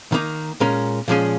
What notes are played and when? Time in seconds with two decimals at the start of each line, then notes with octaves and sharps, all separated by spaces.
0.12 D#3 A#3 D#4
0.60 A#2 G#3 C#4 A#4
1.08 A#2 F3 G#3 C#4 G#4